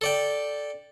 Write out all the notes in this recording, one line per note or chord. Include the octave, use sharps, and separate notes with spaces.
A4 D5 G5